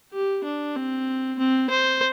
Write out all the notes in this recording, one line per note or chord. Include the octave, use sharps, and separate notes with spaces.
G4
D4
C4
C4
C5